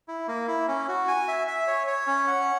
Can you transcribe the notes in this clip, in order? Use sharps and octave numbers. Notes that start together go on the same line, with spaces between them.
E4
A#3
E4
C#4
F#4
G#5
E5
E5
C#5
C#5
C#4
F#5